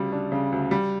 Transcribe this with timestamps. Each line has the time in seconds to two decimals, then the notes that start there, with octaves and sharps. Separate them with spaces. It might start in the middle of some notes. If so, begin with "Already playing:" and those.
Already playing: D2 C#3 G3
0.12 D4
0.32 C#3
0.52 D2
0.71 G3